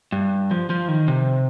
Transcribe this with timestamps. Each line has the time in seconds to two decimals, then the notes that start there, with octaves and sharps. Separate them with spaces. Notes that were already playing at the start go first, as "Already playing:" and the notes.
0.12 G2
0.51 F3
0.70 F3
0.88 D#3
1.08 C3